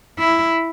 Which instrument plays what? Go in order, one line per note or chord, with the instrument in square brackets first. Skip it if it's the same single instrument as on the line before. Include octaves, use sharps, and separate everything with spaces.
[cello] E4